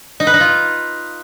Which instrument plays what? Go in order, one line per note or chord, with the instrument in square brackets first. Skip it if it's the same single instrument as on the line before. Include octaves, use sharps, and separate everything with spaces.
[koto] D#4
B4
D#4
F4